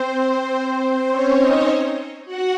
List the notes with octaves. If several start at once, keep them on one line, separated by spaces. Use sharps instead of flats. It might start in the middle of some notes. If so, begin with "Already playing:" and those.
Already playing: C4 C5
C4 C5
C#4 C#5
D#4 D#5
F#4 F#5